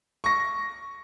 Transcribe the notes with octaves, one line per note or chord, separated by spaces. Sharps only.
C#6 A#6